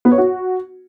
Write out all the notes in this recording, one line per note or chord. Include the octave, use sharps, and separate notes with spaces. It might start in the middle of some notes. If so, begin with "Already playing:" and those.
B3
C#5
F#4